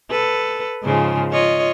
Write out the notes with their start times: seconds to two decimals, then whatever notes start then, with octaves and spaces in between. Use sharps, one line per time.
0.11 A4 B4
0.83 G#2 C#3 F3
1.32 F4 C#5 D#5